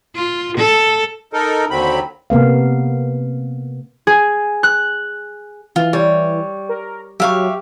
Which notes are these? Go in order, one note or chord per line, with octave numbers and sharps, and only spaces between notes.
F4
A4
D#4 A4 A#4
D#2 D3 F#3 C4 B5
C3 A#3 B3 F5
G#4
F#6
E3 F4
G3 C#5
A#4
F#3 G4 E5 F5 C#6